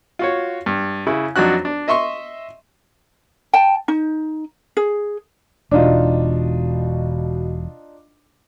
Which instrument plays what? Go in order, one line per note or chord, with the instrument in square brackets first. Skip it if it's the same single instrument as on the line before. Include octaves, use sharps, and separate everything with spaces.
[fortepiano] F4 F#4 C#5
G2
C#3 E4
F2 F#3 D4 D#4 F#4 F#6
D4
D#5 E5 C6 C#6
[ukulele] G5 A5
D#4
G#4
[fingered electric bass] E1 [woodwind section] B2 [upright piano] D4 D#4 F4